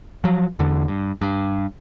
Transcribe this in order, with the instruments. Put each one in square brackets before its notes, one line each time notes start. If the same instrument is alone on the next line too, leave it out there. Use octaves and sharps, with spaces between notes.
[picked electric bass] F3 F#3
E2 D3
G2
G2